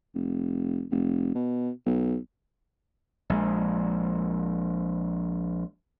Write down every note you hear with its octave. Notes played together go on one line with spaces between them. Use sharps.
F1
F1
B2
B1
A#1 G#3